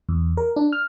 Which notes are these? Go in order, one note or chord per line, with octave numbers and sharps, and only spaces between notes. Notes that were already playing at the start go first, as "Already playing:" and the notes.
E2
A#4
D4
F6